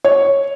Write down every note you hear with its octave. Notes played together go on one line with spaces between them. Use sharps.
C#5